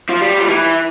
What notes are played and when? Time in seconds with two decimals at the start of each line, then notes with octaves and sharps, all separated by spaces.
0.09 F3
0.21 G3
0.39 F3
0.48 E3